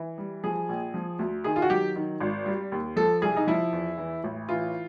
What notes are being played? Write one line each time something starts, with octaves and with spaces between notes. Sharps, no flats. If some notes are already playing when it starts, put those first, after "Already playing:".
Already playing: E3
G3
F3 G#4
A#1
F3
D2
D#3 G#4
F4
F#4
F#3 G4
D#3
G#1
G3
D#2
F3 A4
C2 G#4
D#4
F3 E4
E2
E3
A1
E3 F4